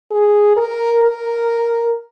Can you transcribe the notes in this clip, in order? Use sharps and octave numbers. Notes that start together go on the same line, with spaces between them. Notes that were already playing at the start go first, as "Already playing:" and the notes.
G#4
A#4
A#4